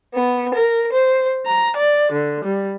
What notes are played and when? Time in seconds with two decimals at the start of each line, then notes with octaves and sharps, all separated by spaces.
0.14 B3
0.52 A#4
0.91 C5
1.46 A#5
1.76 D5
2.13 D3
2.45 G3